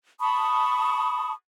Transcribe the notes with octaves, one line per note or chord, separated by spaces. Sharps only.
A5 B5 C#6 D#6